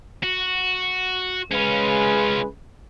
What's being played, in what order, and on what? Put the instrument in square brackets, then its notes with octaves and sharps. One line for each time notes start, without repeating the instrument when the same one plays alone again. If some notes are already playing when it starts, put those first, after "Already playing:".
[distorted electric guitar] F#4
[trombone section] C#3 G#3 B4 [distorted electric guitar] C#4 F4